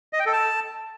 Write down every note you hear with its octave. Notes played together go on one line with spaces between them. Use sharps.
D#5
G5
A4
A5